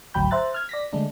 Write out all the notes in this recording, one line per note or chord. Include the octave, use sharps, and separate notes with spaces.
G#1 D2 F#3 G5 B5 G6
C5 E5 A#5 F#6 A6
F6 G#6
D5 A#6 B6
D3 G#3 A3 D4